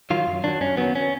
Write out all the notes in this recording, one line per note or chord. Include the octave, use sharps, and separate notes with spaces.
D#3 F#3 F4
F#2
D#3 F#3 D4
F#2 C#4
D#3 F#3 B3
C#4